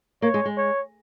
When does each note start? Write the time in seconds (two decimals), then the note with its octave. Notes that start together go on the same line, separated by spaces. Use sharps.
0.22 A#3 C#5
0.34 G#3
0.45 G#3
0.57 C#5